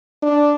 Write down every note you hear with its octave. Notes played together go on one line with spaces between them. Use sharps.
D4